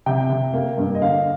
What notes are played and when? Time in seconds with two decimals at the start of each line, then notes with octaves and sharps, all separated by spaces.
0.06 C3 G5
0.30 C3
0.54 A#3
0.78 G2
0.95 D#5
1.02 D3 F5